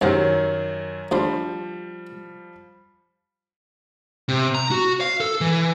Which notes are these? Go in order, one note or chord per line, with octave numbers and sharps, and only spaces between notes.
C2 F#2 D#3 F#3 C5 F#5
D2 F3 G3 C5 C6
C3
A#5
F#4
F5
A4
E3